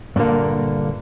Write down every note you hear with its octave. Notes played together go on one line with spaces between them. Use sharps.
G2 A#2 D3 A#3